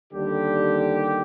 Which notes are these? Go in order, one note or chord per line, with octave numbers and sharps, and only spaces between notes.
D#2 D3 G3 G4